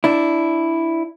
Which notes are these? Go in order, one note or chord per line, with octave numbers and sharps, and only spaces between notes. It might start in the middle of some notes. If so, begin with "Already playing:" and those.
D4 E4